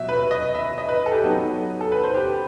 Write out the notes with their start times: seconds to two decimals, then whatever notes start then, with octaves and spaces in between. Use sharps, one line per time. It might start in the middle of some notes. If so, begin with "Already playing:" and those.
Already playing: B2 F#3 E5
0.09 B4
0.31 D#5
0.55 E5
0.78 D#5
0.89 B4
1.06 A4
1.12 G4
1.24 F#3 B3 D#4
1.81 A4
1.92 B4
2.04 C5
2.14 G4